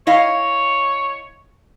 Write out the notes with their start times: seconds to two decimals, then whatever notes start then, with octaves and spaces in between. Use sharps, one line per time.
0.07 E4 C#5 D#5 F5